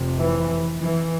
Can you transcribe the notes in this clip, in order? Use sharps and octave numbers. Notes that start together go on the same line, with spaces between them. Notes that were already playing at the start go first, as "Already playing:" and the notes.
Already playing: F1 F2 C3
E3
E3